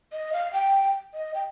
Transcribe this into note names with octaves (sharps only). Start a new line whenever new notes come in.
D#5
F5
G5
D#5
G5